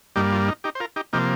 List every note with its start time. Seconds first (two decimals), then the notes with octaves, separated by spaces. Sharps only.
0.16 G2 G3 A#3 D#4 G4
0.32 F4
0.48 D#4
0.64 D#4 G4
0.75 C5
0.80 F4 A#4
0.96 D#4 G4
1.13 C3 F3 A#3 D#4 G4